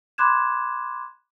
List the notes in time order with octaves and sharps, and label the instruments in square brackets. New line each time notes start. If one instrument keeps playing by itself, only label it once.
[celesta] B5 C6 D6 F#6 G#6 E7